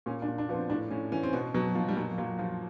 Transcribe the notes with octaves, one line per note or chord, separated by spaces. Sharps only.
A#2 C#4
D4
A#2
D4
F3 B3
C4
A2 D4
A2 C#4
E3 C#4
C4
B2 B3
B2 F#3
B2 F3
G3
A#2 F#3
A#2 F#3
F3